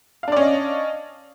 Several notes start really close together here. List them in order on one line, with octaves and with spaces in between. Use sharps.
F5 D4 D5 C#4 D#5